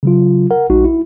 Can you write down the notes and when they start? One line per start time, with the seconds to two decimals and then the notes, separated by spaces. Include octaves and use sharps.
0.03 C#3 F#3 F4
0.51 A#4 F#5
0.70 A#1 G#3 D#4 F#4
0.84 E4